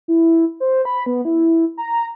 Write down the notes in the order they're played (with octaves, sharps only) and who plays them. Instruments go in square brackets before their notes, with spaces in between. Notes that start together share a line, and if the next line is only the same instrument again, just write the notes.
[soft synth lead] E4
C5
B5
B3
E4
A#5